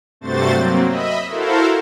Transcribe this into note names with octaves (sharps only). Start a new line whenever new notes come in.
G2 C3 A3 F#4 C5 A6
F#3 A#3 C4
D#5 E5 B5
E4 F#4 A4 A#4 C5 F5